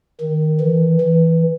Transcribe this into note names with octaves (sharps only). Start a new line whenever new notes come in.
D#3
E3
E3